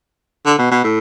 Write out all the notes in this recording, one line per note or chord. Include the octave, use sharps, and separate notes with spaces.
D3
B2
B2
A2